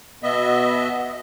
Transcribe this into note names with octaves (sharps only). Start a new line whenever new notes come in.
B2 B3 D#5 E5